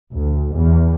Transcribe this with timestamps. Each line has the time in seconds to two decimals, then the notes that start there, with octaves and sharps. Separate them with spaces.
0.11 D2
0.55 E2